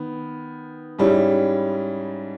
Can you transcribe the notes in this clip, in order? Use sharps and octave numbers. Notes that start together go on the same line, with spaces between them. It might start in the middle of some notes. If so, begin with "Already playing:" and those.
Already playing: D#3 B3
G#2 G3 C#4 E4